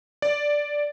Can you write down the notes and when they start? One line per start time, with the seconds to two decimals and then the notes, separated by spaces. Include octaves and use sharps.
0.22 D5